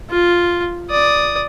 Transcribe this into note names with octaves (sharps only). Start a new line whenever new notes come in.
F4
D5 D#6